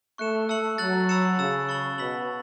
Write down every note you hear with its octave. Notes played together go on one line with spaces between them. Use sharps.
A3 C#6 F#6 C#7 E7
A3 A5 E6 C#7 F#7
F#3 F#6 A6 F#7
B5 E6 A6 C#7 E7
C#3 E6 A6 E7
C#6 A6 F#7
B2 B5 E6 B6 F#7